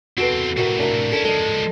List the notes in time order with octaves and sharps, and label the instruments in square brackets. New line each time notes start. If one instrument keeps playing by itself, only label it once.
[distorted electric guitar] E2 C4 [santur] F#4 A4 B4
[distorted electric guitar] A2 C3 [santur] F#4 A#4 E5
[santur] D4 A#4 F5
[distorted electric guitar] C#4 E4 [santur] A4 E5
[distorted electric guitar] F3 G#3 [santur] A4 D#5